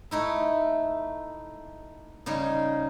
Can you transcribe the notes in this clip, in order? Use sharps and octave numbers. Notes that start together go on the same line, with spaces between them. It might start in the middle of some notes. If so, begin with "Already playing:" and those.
A3 D#4 E4
C#3 G3 D#4 G#4